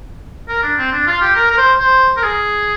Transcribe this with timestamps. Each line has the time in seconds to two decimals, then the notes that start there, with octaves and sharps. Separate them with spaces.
0.48 A#4
0.63 D4
0.78 C4
0.92 D4
1.07 F4
1.21 G4
1.36 A#4
1.50 A#4
1.58 C5
1.79 C5
2.17 A#4
2.23 G#4